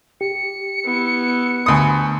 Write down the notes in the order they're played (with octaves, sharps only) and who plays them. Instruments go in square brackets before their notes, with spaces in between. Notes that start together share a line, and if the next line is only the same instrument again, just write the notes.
[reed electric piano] G4 [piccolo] C#7
[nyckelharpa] B3 E4
[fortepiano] D2 D#6 [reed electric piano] G#5 B5